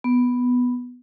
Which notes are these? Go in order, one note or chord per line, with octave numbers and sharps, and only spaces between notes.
B3